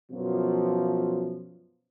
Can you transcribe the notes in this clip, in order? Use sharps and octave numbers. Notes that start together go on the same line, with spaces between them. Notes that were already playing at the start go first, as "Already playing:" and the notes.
F#2 B2 F3